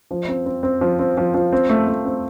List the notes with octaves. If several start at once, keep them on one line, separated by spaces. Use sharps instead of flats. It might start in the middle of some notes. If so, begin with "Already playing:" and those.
F3
C4
C4
C4
F3
C4
F3
F3
C4
A3
A3
C4